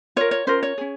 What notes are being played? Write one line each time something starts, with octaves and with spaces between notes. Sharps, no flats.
F4 A#4 C#5
C#5
C#4 F4 A#4 C5
C#5
C#4 G#4